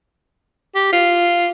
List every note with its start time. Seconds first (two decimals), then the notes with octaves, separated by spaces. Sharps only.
0.75 G4
0.93 F4